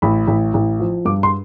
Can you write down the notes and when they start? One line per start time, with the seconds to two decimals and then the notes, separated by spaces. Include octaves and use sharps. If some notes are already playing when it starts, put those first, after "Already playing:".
0.02 A1 B5
0.27 A1
0.54 A1
0.80 F3
1.05 G2 D6
1.23 C6